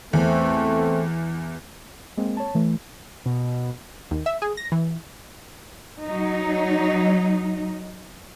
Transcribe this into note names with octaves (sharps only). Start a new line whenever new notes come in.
E2 A3 C4
G#3 A#3 C4
C#5 A5
E3 A3
B2
D#2
E5
G#4
A#6
E3
F#3 D#4